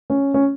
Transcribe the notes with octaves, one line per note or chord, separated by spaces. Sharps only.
C#4
C#4